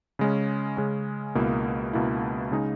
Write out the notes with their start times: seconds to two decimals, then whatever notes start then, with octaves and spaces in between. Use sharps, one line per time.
0.19 C#3 G#3 C#4
0.77 C#3 G#3 C#4
1.35 C#2 B2 A#3 E4
1.93 C#2 B2 A#3 E4
2.51 C#3 G#3 D#4